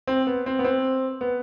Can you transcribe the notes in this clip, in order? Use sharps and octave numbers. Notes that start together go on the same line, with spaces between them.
C4
B3
C4
B3
C4
B3